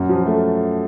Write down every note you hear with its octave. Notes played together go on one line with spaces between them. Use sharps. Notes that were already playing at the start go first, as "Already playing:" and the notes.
Already playing: F#2
F3
A3